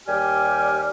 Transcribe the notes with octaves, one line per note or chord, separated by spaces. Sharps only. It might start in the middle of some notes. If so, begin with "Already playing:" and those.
D#2 G3 G4 G5 G#5 F6